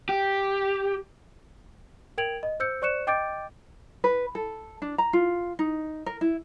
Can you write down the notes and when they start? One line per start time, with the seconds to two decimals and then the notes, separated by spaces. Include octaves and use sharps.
0.09 G4
2.18 A#4 G5 G#6 D7 F7 F#7
2.43 D#5
2.60 C5 E6 G6 C#7
2.82 C5 D5 C#6 F#6 C#7 E7
3.07 D#5 G5 D6 G6 A6 D7
4.04 B4
4.35 A4
4.82 D4
4.98 A#5
5.13 F4
5.59 D#4
6.06 A#4
6.21 E4